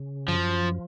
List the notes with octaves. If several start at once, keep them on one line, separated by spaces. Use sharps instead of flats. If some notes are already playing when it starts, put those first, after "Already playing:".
Already playing: C#3
F#2 F3
F3